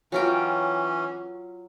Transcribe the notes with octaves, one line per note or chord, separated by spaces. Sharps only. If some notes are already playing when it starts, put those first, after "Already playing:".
E3 F#3 C#4 F4 G5